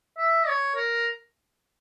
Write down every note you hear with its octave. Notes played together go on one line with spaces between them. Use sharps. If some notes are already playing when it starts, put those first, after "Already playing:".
E5
C#5
A#4